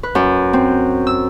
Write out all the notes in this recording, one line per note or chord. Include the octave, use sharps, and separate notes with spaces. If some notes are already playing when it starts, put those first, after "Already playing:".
B4
F#2
C4
E6